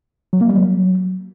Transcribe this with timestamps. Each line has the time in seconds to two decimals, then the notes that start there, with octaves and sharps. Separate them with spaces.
0.33 F#3
0.41 A#3
0.49 G3
0.57 F#3